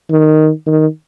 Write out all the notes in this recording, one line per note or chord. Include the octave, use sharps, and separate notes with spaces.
D#3
D#3